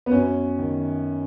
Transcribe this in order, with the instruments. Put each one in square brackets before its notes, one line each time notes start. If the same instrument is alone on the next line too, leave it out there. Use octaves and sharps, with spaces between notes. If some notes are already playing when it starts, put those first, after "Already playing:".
[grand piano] B3
F#2 C#4
D#3